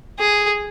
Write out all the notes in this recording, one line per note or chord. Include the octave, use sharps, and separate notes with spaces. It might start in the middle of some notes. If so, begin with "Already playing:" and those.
G#4